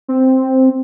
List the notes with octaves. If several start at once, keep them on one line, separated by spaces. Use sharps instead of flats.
C4